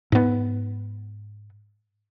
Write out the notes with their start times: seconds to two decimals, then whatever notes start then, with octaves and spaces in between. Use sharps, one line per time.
0.12 G#2 B3